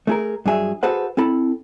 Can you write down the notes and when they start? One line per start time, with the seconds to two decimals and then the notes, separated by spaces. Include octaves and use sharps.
0.07 A3 G#4 A#4
0.46 G2 F#3 G#4 E5
0.83 F#4 G#4 A4 B4 C5 F#5
1.17 C4 E4 A4 B5